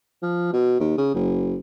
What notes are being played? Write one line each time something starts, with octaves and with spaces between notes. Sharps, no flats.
F3
B2
D#2
C#3
F#1